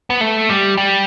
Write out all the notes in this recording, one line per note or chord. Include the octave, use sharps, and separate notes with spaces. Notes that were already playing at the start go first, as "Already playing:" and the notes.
B3
A3
G3
G3